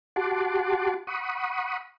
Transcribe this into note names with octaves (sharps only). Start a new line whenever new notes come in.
F#4 G4 F#5 A5 C6 D6
F#5 B5 C#6 D#6